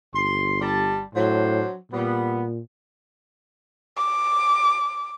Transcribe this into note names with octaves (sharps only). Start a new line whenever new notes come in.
G1 C6
G3 A5
A2 F#3 D4 C5
A#2 G3 B3
D6